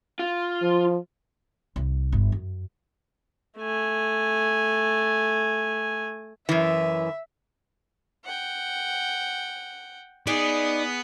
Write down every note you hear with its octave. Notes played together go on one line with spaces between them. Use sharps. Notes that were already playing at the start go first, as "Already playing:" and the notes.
F4
F3
C2
G1
F#2
A3 G#5
F#2 E3 E5
F#5 G5
B3 D#4 G#4 D5